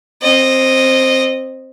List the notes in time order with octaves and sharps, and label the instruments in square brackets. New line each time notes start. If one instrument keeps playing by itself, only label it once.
[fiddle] C4 D#5